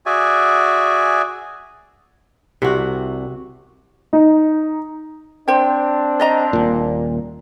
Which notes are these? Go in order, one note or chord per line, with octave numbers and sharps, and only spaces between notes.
F#4 G#4 D5 E5 G#5
C2 C3 F#4
D#4
C4 D4 C5 G5
D5 D#5 A#5
D#1 A#2